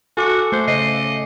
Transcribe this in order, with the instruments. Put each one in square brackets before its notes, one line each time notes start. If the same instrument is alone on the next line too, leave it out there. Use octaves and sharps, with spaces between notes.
[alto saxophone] F#4 [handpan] A4 [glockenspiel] G#5 D6 C#7
[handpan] A3 [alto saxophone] C5
[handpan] C#3 [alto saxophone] D#5 [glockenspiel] C7